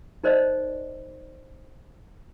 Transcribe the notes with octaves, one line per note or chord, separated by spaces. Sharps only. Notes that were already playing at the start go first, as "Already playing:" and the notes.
D#4 A#4 C5 D5 D#5